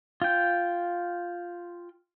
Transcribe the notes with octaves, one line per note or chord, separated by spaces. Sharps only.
F4 G5